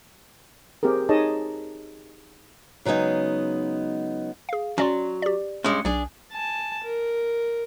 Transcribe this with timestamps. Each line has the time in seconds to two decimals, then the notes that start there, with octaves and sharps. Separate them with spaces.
0.83 C4 G4 G#4 A#4
1.09 D#4 G#4 C#5 D#5 A5
2.85 C#3 F#3 G#3 B3 D#4
4.49 G#4 F5
4.78 F#3 C#4 D5 C6
5.22 G4 D5
5.64 G2 G#3 C#4 F#6
5.85 B1 D4 G#4
6.32 G#5 A5
6.83 A#4